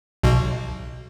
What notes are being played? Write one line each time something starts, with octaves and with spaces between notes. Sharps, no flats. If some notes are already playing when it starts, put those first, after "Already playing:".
B1 B2